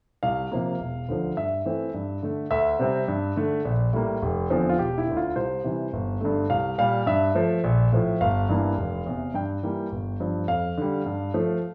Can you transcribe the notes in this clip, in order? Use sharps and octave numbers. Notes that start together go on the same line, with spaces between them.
C2 F5
C3 F3 A#3
E1
D2 D3 F3
G2 E5
E3 A3 C4
G2
D3 A3
D2 E5
C3 G3 C4
G2
D3 A3
A#1
A2 G3 A#3
F1
E2 D3 F3 C4
F4
E1 G4
E4
D2 D3
F4
C2 C5
C3 E3 G3
G1
G2 D3 A3
C2 F5
A#2 G3 F5
G2 E5
F3 A3
A#1
A2 F3
G1 F5
G2 E3 A#3
F1
E2 C3
G2 G5
E3 G3 A#3
G1
G2 F3
F2 F5
D3 G3
G2
F3 A3